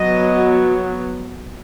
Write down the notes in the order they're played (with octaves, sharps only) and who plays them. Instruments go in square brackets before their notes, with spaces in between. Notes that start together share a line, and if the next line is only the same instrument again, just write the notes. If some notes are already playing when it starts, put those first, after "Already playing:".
Already playing: [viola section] F#3 B3 D#5